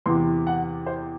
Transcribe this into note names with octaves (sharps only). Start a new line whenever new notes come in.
E2 C3 E3 C6
F#5
C5